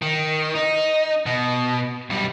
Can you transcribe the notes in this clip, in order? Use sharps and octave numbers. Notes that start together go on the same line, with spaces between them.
D#3
D#4
B2
B1 G3